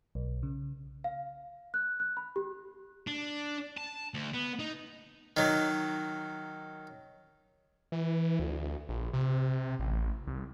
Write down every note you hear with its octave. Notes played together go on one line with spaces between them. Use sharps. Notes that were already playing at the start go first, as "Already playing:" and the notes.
B1
C#3
F5
F#6
F#6
B5
G4
D4
A5
D2
B3
D#4
D#3 F#3
E3
D2
A#1
C3
A1
C2